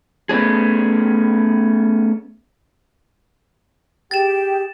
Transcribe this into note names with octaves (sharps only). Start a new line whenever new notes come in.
A3 B3 C#4 G#4
G4 G#4 G5 A6 E7